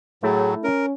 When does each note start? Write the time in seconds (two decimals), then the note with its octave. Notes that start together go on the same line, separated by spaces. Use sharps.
0.23 A2 F#3 A3 E4 G#4
0.64 C#4 A#4